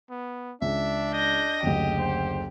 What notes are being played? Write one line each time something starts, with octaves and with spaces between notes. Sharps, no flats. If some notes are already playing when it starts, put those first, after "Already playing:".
B3
C#2 D4 E5
D#5 G6 A#6
F#1 D2 G4
C5